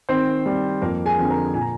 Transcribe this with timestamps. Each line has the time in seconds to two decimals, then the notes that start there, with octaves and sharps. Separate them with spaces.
0.09 D#3 C4 C5
0.46 G3 C4
0.82 F2 A#3 A#4
1.05 G#4 G#5
1.18 D3 F3 C4
1.30 A#4 A#5
1.54 A#2 G#5
1.61 A#5